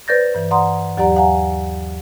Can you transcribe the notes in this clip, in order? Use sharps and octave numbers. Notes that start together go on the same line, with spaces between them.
B4 C5 D5 G6 A6 A#6
G2 E3
D5 F#5 A#5 C6 D#6
D#2 F#3 G4 D5 F#5 A#5
F5 F#5 G#5 A#5